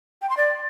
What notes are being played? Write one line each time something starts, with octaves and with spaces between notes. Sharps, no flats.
G5
C6
D5